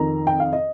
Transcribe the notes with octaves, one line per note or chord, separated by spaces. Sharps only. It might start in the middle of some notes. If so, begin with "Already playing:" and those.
Already playing: F2 D#3 A#5
G5
F5
D#5